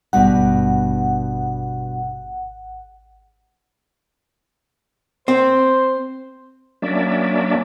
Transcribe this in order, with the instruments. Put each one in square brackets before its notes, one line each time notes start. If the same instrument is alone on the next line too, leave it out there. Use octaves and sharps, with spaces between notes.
[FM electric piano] G#1 F#5 [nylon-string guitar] G2 B2
[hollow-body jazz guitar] C4 [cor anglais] C5
[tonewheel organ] F#3 A#3 C#4 D4 D5 E5